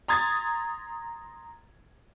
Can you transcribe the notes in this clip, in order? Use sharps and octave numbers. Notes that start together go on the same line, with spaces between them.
A#5 C6 D#6 G#6 A6